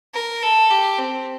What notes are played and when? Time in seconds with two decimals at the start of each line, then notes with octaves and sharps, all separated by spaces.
0.14 A#4
0.43 A4
0.71 G4
0.99 C4